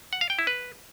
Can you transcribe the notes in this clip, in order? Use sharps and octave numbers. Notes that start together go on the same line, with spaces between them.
F#5
F5
G5
E4
B4